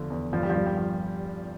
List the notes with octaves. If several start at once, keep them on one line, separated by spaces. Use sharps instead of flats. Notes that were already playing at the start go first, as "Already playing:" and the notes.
Already playing: E2 D3 F3
E2
G2 F3
G3
F3
G2 G3
G3
F3